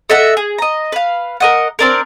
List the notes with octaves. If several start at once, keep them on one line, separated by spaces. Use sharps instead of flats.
A4 D#5 E5 F#5
G#4
D#5 A#5
B4 F5
A#4 D#5 F#5
C4 D4 A#4